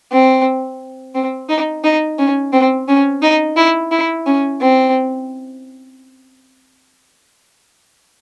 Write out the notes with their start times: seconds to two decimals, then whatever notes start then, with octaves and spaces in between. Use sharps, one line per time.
0.12 C4
1.15 C4
1.49 D#4
1.84 D#4
2.19 C#4
2.53 C4
2.88 C#4
3.23 D#4
3.57 E4
3.91 E4
4.26 C#4
4.61 C4